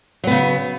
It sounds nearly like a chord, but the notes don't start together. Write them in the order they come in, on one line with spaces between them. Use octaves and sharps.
F#3 B3 C#3